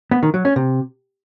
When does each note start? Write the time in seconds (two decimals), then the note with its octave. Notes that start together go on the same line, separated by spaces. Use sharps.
0.11 B3
0.23 D#3
0.34 F#3
0.45 C#4
0.56 C3